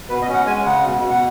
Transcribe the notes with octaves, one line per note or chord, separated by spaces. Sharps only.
B2 B4
D#5
C#4
F#5
G#3 G#5
C#3 F#5
B2
B2
F#5